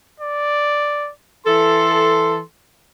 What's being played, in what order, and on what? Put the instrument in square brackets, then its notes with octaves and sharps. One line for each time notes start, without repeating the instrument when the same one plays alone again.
[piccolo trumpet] D5
[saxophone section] E3 A4 [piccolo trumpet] C6